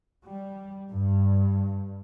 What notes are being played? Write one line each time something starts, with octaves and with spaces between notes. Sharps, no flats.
G3
G2